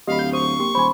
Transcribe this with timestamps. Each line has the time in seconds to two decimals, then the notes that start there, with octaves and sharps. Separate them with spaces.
0.07 D1 G4 D#5 F5 B5
0.19 G6
0.33 C5 C#6 D#6
0.59 A#3 G4 C6
0.75 D#1 C5 G#5 B5 C6